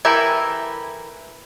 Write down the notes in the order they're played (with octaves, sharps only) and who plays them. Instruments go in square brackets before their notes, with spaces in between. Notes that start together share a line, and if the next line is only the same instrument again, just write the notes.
[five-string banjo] E3 E4 G4 A4 A#4